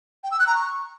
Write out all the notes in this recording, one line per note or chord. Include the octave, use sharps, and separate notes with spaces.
G5
E6
F#6
A#5
C#6